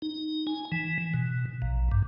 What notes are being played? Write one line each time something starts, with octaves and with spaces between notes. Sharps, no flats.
D#4
G#5
E3
B2
A#1
G2